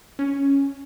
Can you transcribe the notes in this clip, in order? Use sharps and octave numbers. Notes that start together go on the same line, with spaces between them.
C#4